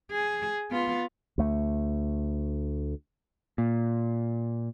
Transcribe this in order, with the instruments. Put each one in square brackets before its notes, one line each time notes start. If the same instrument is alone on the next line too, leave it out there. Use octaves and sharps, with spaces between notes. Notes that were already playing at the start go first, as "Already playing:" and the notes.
[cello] G#4
B3 F4
[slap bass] D2 A3
[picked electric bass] A#2